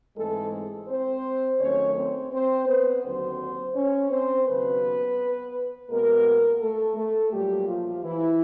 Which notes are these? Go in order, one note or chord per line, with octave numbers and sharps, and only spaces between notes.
G#2 E3 G#3 A3 C4 A4
C4 C5
D#2 D#3 F#3 A3 C#4 C#5
C4 C5
C4 C5
B3 B4
D#2 D3 F#3 C4 C5
C#4 C#5
C4 C5
D#2 C#3 F#3 B3 B4
B2 G#3 A#3 B3 A#4
A3 A4
A3 A4
A#2 F#3 G3 A3 G4
F3 F4
E3 E4